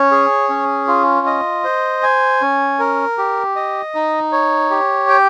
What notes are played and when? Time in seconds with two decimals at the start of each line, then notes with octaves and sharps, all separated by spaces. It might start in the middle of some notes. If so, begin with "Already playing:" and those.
Already playing: C#4 C#5
0.11 G#4
0.49 C#4
0.88 F4
1.26 D#5
1.64 C5
2.03 G#5
2.41 C#4
2.79 A#4
3.18 G4
3.56 D#5
3.95 D#4
4.32 C#5
4.70 G4
5.09 G5